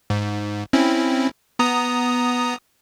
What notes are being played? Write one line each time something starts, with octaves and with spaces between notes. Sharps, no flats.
G#2
C4 C#4 E4
B3 A#5 D#6